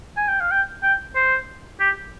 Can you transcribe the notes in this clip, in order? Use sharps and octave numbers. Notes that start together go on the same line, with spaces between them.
G#5
G5
F5
G5
G5
C5
G4